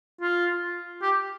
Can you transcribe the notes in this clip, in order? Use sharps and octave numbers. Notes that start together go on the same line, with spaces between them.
F4
G4